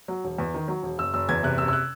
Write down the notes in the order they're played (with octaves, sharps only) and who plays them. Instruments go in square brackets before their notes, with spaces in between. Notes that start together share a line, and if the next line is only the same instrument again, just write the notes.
[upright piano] F#3
E1
E2
D#3
F#3
E1
F#1 E6
F#1 E6
E2 G#6
C3 F#6
F#1 E6
E6
F#6